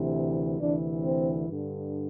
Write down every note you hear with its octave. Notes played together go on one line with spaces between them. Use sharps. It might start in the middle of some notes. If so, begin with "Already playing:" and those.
Already playing: D2 C3 E3
D2 C3 E3 D4
C4
G2 D3